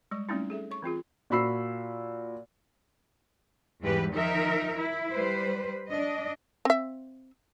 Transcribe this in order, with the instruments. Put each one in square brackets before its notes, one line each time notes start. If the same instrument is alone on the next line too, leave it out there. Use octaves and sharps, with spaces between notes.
[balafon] G3 G#3 C#6
G3 A3 C4 C#4 D#4 E4
G#4 A4 E5
C#5 C#6
E3 C4 F4 G#4
[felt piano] A#2 F#4 B5 E6 C7
[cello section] E2 G#2 E3 G3 G4 B4
D#3 F3 D#4 A#4 E5
E4
G3 B4 C5
D4 D#5
[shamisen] C4 E5